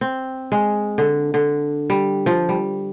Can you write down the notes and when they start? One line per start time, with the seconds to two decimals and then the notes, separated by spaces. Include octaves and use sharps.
0.01 C4
0.52 G#3
0.98 D3
1.34 D3
1.90 G3
2.26 F3
2.49 G3